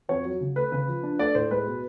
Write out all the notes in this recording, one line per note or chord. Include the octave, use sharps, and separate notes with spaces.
F2 C#5
F#3
C#3
A3 B4
C#3 B4
F3
D4
A3 D5
A2 C5
G#3 B4
B2